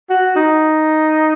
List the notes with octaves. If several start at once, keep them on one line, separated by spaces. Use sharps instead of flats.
F#4
D#4